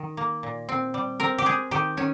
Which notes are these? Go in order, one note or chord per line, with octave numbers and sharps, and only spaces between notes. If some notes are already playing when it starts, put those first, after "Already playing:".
Already playing: D#3
A#3
A#2
C4
G3
C4 A#4
G4
G#3 G#4
D#3 G4
D#3 C#4